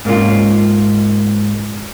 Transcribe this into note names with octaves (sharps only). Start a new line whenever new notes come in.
G#2 A#3 C#4 F4